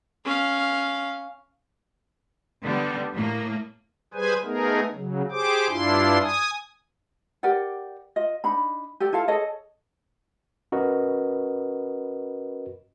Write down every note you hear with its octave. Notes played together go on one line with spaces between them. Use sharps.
C#4 F5
D3 G3 B3
A2 A#3
G3 G#4 B4 C5 G#5
A3 B3 D#4 G#4 A#4
C#3 F#3
G4 G#4 C5 D6
G2 D4 E4 F4 C6
G#5 D#6
G4 A#4 D5 F#5
F4 D#5
D4 D#4 B5
G4 A4 D5
E4 F4 A4 F5
G#4 A4 C#5 D#5
C#4 F#4 A#4 B4 D#5